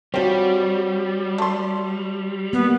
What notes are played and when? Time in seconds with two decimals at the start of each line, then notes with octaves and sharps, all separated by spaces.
0.14 F3 G3 C4 F#4 C#5
1.38 A3 C6
2.53 A#3 B3